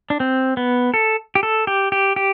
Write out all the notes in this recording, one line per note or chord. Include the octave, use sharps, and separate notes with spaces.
D4
C4
B3
A4
G4
A4
G4
G4
G4